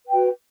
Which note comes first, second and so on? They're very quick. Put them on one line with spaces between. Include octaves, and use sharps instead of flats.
B4 G5 F#4